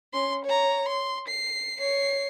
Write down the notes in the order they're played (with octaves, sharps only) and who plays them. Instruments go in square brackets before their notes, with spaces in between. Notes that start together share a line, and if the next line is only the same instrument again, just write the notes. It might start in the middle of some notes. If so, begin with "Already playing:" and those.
[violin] C#4 C6
C#5 A#5
C6
C7
C#5 C7